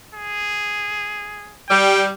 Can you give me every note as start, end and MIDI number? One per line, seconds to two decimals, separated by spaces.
0.15 1.56 68
1.69 2.08 55
1.69 2.06 79